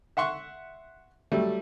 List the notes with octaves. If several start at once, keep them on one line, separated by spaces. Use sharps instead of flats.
E5 F#5 C6 C#6
F#3 G3 A3